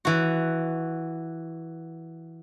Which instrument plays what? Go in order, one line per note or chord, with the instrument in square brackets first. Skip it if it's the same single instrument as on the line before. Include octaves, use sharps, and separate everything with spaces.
[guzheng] E3 F#4